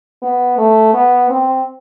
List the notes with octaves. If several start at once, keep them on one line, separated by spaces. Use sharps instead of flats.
B3
A3
B3
C4